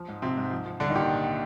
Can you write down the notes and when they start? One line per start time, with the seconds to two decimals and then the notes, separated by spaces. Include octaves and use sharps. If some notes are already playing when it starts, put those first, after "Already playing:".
Already playing: F3
0.08 G#2
0.22 C3 F3 C4
0.37 G#2
0.51 F3
0.66 F3
0.80 C2 D3 D4
0.90 D#3 D#4
0.95 A#2 G4